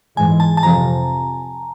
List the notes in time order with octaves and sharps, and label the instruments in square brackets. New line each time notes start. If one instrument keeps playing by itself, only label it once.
[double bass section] G#2 E3 G#3 [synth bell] G#5
[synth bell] A5
A5
[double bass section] F2 C3 F3 [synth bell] A#5